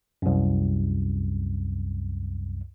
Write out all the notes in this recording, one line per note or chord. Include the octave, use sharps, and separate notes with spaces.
C2 F#2